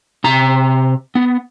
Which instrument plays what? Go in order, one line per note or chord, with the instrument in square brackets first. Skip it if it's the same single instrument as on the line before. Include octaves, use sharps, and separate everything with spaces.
[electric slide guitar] C3 A#5
B3